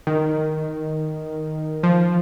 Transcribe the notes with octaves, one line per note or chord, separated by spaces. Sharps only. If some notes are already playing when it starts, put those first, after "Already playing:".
D#3
F3